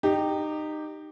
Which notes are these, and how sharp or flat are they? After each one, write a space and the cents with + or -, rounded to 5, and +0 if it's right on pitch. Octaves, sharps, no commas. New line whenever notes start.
D#4 -20 G4 +0